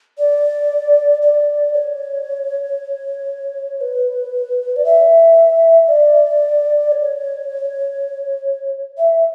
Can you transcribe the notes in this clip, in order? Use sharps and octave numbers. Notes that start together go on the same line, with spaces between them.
D5
D5
C#5
B4
D5
E5
D5
C#5
E5